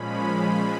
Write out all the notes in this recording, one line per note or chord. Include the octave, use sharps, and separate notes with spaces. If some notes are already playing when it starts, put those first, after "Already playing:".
Already playing: A#2 F3 G#3 C#4 B5